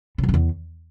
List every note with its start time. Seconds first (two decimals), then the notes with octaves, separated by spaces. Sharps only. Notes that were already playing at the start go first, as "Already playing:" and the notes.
0.18 C#3
0.23 F#2
0.29 C#3
0.34 E2